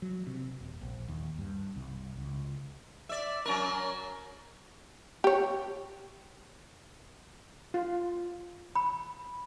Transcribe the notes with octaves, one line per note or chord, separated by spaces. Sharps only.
F#3
C3
D#1
A#1
D#2
G2
C2
C#2
D5 E5
F#3 C#4 A#4
G4 C#5
F4
B5